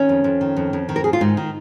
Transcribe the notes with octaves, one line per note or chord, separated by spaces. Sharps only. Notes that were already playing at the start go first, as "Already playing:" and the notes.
Already playing: D#3 C#4
F2
F2
D#3
F2
F2
D#3
A#4
D#3 G#4
F4
G#2 D#4
D#3